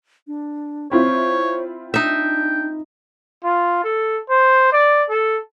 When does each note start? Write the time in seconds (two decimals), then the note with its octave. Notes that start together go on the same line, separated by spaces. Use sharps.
0.27 D4
0.92 C4 E4 F4 C5 C#5
1.94 D4 D#4 E5 G5
3.44 F4
3.84 A4
4.30 C5
4.73 D5
5.09 A4